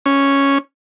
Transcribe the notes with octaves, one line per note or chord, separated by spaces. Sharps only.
C#4